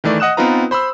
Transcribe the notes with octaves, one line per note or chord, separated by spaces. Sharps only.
D#3 E3 A3 D5
D#5 F#5 D#6 F#6 E7
B3 C4 D#4 F4 B4 A#5
C5 B5 C6 E6